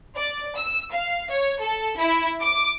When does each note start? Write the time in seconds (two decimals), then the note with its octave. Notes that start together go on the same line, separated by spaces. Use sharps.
0.17 D5
0.58 E6
0.93 F5
1.31 C#5
1.63 A4
1.99 E4
2.41 D6